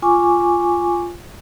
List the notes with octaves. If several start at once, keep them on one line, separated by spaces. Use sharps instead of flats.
F4 G#5 C#6 D6